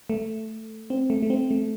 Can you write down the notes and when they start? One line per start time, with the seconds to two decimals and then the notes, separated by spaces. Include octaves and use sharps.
0.10 A3
0.90 C4
1.10 A3
1.23 A3
1.30 C4
1.51 A3